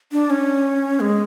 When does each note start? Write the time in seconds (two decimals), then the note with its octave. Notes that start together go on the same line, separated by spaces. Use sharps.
0.12 D4
0.30 C#4
1.00 G#3